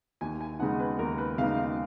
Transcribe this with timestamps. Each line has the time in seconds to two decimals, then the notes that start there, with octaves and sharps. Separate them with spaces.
0.21 D#2 G#5
0.41 G#5
0.59 C#3 G#3 B3 D#4 F#5
0.79 B4
0.99 D#2 A#4
1.18 B4
1.38 C#3 G#3 B3 D#4 F5
1.57 F5